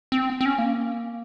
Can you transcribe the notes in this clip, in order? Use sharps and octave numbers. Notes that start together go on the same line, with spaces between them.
C4
C4
C#4
A#3